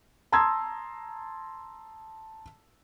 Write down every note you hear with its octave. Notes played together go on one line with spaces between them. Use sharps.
A5 A#5 C6 D#6 E6 G#6